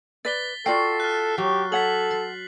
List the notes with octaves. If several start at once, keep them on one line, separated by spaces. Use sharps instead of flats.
B4 D5 A6 B6 G7
F4 F#4 A4 D5 G5 C7
F6 F#6
F#3 G4
A4 C#5 F#5 B6 F#7
C6